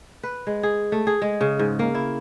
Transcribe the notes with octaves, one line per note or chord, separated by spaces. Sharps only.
B4
G#3
G#4
A3
G#4
G#3
C#3
G#2
A#3
E4